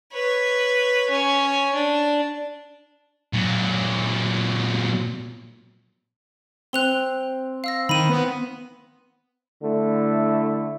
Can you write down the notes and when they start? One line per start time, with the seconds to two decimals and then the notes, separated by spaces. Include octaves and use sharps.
0.13 B4 C#5
1.10 C#4
1.75 D4
3.33 A#2 F#3
6.73 C4 F#6 F7 G7
7.64 F5 E6 A#6
7.89 D#3 B5 D#7
8.10 B3
9.63 D3 A3 E4